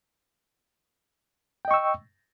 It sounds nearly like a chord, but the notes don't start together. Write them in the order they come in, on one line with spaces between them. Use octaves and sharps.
G5 D#5 C#6 E6